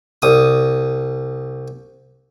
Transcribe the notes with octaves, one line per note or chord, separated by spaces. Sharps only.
C2 D#6